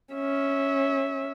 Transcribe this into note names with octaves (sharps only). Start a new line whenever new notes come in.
C#4 E5